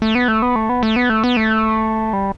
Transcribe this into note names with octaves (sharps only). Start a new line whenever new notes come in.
A3
B3
A3
B3
A3
B3
A3
B3
A3
B3
A3
G3